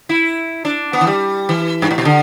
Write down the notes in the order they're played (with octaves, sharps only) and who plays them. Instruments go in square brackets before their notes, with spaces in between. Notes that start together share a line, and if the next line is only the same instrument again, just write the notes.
[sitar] E4
D4
B3
E3
G3
E3
G2
A2
B2
D3